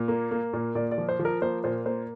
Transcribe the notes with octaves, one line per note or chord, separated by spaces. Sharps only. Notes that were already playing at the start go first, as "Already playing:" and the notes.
Already playing: A#2
A#3
A#3
A#2
A#2 D5
D5
F3
C5
F3
A#4
A#3 C5
A#2 C5
A#3 C5